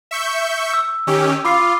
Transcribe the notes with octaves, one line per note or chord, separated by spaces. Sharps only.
E5 C#6 G6
E6
D#3 C#4 G4
F4 B5 D6 C7